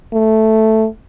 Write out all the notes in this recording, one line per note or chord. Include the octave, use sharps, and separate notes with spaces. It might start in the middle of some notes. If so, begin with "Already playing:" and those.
A3